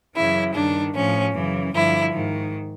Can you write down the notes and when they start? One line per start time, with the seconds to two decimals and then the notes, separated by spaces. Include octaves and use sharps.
0.15 F#2 C#3 E3 E4
0.55 G2 D#3 D4
0.95 A2 F3 C#4
1.35 F#2 C#3 E3
1.74 G2 D3 F3 E4
2.14 G#2 D#3